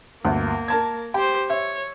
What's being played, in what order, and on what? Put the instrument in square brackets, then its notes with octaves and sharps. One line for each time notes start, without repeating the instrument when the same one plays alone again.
[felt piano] G1 D2 [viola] A#3
[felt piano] A#4 A5 G#6
[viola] G4 C5 [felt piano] G5
[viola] C#5 [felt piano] E5